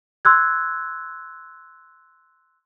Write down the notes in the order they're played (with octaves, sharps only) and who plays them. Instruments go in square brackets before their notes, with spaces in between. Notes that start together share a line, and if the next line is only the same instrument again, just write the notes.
[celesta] C6 E6 F#6 G#6